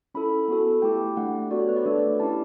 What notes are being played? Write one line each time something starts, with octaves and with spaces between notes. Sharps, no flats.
C#4 E4 A4 B5
B3 F#4 A4
A3 E4 G4 G5
A3 D4 G4 F#5
B3 F#4 A4 D5
C#5
B4
D5
A3 D4 A4
C#4 E4 G4 A5